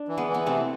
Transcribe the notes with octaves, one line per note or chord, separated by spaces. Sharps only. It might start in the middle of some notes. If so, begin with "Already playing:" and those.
Already playing: D4
E3
G#3 B3
E3
B3
C3 A3 C4